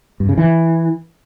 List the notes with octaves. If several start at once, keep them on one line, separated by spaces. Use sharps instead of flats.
G2
C#3
E3